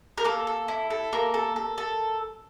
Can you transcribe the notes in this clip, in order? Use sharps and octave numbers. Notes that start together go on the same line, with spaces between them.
A#4
A#3 A4
A4
E4
A4
A#3 A#4
A4
A4
A4